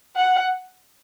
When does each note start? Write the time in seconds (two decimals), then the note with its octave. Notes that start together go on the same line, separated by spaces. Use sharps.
0.16 F#5